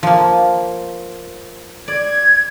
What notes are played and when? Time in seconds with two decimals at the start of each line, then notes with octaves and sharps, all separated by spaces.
0.03 F3 A#3
1.88 D5 G#6